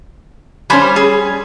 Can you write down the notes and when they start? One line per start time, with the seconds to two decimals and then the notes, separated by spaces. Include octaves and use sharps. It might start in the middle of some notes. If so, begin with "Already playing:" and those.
0.70 G3 C#4 C5 G#5 B5
0.96 G#4